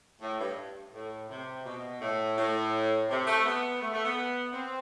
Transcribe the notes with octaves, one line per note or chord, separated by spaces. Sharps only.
A2
G2
A2
C3
B2
A2
A2
C3
A3
B3
A3
A3
B3
C4